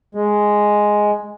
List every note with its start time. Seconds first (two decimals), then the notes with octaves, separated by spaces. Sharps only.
0.15 G#3